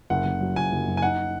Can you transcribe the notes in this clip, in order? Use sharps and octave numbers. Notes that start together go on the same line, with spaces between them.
F#1 F#5
F#1
F#3
F#1 G#5
F#1
F#2
G#5
D#4 F#5